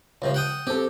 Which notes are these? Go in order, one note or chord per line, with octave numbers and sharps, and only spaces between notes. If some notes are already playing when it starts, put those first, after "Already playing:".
C#2 C3 F3
F#5 G5 D#6
C4 G4 A4